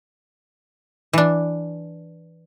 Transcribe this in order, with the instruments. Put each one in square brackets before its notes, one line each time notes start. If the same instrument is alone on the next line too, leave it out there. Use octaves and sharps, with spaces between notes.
[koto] E3 D4